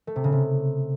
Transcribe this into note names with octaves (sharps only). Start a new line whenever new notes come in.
A3
C3
C#3
C3